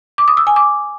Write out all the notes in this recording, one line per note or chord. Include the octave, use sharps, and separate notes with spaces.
D6
D#6
E6
G#5
D6